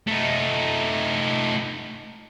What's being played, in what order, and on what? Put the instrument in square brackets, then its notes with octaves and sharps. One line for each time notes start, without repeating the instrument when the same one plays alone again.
[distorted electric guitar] A3 D#4